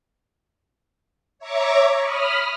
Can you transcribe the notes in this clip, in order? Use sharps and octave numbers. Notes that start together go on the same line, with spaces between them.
C#5 E5 A#5 C#6 D6
B5 D#6 F6